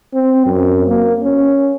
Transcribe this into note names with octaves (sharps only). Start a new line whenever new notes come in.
C4
F#2
A#3
C#4